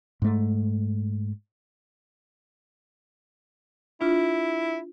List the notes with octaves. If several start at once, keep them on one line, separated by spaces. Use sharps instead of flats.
G#2 A3
D4 E4 F4